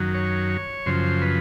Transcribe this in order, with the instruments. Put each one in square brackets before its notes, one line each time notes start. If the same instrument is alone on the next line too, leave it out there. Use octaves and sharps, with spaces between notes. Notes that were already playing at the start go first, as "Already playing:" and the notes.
Already playing: [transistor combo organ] F#2 D#3 F#3
C#5
F#2 C#3 F3 C5
B4